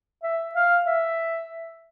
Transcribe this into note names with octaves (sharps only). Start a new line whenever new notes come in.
E5
F5
E5